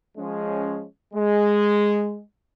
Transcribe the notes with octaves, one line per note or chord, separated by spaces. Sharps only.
F3 G#3 C#4
G#3